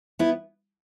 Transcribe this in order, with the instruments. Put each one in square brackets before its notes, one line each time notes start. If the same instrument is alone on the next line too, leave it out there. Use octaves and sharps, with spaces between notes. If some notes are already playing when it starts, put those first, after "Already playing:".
[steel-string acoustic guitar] B3 E4